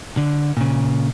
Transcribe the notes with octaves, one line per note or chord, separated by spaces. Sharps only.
D3
A#2 C#3